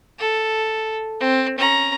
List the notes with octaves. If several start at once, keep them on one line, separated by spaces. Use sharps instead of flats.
A4
C4
C#4 A#5